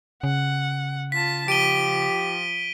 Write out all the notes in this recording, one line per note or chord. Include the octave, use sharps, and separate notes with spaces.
C#3 F#5
F4 A5 B6
F3 G4 D7 D#7 G7